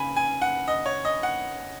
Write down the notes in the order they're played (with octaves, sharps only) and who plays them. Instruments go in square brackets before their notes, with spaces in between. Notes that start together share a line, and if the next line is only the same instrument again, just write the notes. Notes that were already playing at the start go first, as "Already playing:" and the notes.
Already playing: [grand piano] C#3 G#5 B5
G#5
F#5
D#5
C#5
D#5
F#5